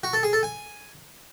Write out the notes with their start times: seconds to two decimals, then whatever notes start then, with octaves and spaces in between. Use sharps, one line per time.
0.03 F#4
0.13 A4
0.23 G#4
0.33 A4
0.43 G#5